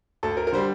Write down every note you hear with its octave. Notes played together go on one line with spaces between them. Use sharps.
D2 A4
A#4
A#4
D3 G3 C5